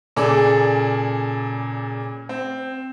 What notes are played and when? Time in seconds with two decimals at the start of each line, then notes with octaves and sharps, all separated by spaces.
0.16 A#2 C#3 G#4 A4 D5
2.29 C4